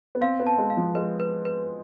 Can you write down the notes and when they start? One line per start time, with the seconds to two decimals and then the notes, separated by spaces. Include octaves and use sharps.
0.15 B3
0.21 C4 F5
0.40 B3
0.46 A5
0.58 G#3
0.70 F5
0.77 F3
0.95 G#3 B4
1.20 B4
1.45 B4